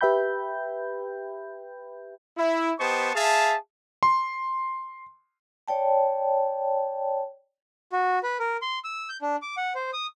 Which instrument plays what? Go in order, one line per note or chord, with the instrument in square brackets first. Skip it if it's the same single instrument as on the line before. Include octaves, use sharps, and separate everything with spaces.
[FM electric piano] G4 B4 E5 G5 B5 G6
[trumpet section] E4
B3 G4 C5 D#5 A5 C#6
G#4 E5 F5 A5
[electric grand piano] C6
[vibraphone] C#5 D5 G5 A5
[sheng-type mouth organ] F#4
B4
A#4
C6
E6
G6
D4
D6
F#5
C5
D#6